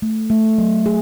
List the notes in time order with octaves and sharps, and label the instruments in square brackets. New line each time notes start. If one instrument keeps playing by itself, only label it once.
[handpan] A3
A3
F#3
G#4